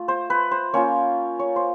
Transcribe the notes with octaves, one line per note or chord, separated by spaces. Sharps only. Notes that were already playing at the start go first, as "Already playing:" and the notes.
Already playing: A3 F4
C5
B4
C5
A#3 C#4 F4 C#5
C#5
C5